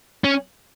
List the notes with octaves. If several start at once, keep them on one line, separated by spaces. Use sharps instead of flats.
C#4